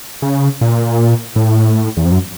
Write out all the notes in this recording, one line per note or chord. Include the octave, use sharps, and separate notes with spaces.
C#3
A#2
A2
E2
F2
F#2